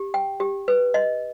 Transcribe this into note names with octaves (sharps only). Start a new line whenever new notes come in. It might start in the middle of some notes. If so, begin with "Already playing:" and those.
Already playing: G4
G5
G4
B4
D#5